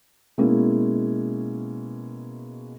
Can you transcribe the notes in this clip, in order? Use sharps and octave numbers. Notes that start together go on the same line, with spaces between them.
B2 G#3 A#3 C#4 E4